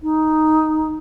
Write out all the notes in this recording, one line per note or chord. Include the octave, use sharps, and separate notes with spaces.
D#4